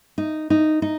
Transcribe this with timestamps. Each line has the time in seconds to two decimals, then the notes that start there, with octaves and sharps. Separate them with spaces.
0.18 D#4
0.50 D#4
0.82 D#4